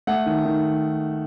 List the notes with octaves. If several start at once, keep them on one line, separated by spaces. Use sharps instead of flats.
A3 F#5
D#3
D#3